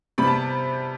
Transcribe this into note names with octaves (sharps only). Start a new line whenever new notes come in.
C3 G3 B3 B5
A5